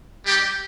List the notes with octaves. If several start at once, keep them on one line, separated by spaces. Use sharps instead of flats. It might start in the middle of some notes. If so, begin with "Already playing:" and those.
G3 D#4 G4